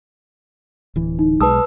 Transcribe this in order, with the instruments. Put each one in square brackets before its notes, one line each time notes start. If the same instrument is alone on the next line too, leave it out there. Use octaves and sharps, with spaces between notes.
[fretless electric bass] D1 E3
[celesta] D#4
[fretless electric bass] B1 G#3 [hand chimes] B4 E6 [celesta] A5 D#6